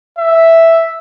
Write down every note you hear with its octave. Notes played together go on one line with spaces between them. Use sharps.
E5